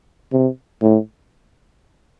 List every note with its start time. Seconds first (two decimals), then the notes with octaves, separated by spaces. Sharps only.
0.33 C3
0.82 A2